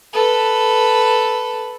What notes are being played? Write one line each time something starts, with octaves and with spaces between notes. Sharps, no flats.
A4 B4